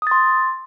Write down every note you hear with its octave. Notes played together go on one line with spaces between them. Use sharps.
C6 D#6 A6